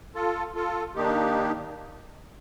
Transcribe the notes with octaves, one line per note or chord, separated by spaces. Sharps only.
F4 A4
F4 A4
D#3 A#3 D4 D#4 G4